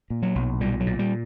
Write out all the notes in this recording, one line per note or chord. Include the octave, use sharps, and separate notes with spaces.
A#2
F#3
B1
A#2 G3
F#3
A#2
G3